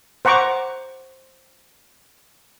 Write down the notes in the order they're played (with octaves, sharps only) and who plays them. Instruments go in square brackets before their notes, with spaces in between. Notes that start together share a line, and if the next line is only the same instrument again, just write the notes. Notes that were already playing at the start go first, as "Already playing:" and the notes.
[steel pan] C5 F#5 A#5 C#6 D6